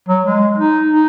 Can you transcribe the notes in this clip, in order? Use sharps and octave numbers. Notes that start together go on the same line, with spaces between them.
F#3
G#3
D#4
D#4